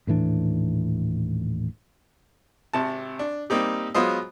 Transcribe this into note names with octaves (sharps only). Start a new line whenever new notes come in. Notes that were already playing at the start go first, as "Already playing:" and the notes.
D#1 A2 E3 D4
G#1 C3 A5
D4
G3 A#3 C4 D#4 G4
F#3 G#3 B3 F4 C5 D#5